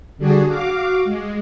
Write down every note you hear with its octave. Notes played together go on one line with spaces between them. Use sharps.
D3 G3 D4 F#4 G#4
F#4 F5 D6
G#3